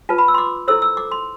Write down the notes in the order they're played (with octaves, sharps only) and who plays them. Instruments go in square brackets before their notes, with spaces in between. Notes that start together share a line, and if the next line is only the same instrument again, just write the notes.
[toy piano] F4 B4 A5
B5
E6
C6
D6
E4 A4 C5 E6
E6
D6
C6